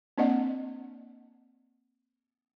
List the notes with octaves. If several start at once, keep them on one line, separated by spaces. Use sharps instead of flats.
A#3 C4 D4 D5 D#5 F#5